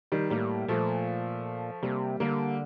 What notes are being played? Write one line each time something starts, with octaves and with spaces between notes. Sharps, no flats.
D#3 G3
A2 G3 A#3
A#2 F3 A3
C3 G3 A#3
D3 G3 A#3